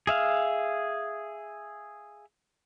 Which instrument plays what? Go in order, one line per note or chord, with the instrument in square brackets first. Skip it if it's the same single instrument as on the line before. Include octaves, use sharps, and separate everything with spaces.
[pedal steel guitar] G#4 E5 F5